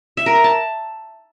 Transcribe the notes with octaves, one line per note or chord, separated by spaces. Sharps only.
E5
A#4
A#5
A5